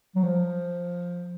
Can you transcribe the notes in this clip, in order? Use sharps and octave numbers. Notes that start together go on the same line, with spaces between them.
F#3
F3